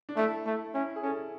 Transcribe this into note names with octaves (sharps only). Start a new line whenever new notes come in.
D4
A3 E4
A3
C#4 E4
G#4
C#4 A4